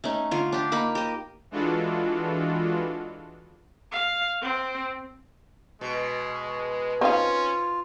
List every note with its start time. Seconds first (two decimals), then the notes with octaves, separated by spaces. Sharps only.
0.04 A3 C#4 D#4
0.31 D3 F4
0.52 D4 G4
0.72 A#3 D#4 B5
0.95 G4 D#5
1.51 E3 G#3 D4 F4 F#4 A4
3.92 F5
4.42 C4
5.81 B2 G#3
7.01 C4 C#4 D#4 F4 F5